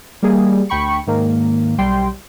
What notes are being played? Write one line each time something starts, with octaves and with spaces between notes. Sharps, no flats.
G3 A#3 G#4
D2 G5 B5 C#6 C#7
G#2 D#3 A#3
B1 G3 G5 C6